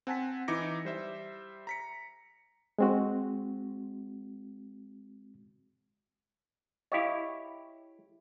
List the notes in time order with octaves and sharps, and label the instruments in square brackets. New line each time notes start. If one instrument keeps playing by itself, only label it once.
[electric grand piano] C4 F#5 G#5 A5 B6
E3 D#4 E4 D6 A#6 C#7
G3 C5 E5
A#5 B6 C#7
[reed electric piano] G#3 C4 F#4
[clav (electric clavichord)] E4 G4 C#5 [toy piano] D#5 F5 D#6